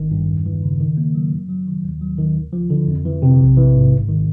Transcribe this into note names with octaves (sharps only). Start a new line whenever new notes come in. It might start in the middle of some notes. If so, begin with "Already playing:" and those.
Already playing: G#1 D#3
G2
E2
E3
C#3
D#3
A#3
F#3
F#2
F#3
D#3
D#2
F#3
D#3
D2
F3
D3
F2
E3
C3
A#1
E3
G#2
G1
D#3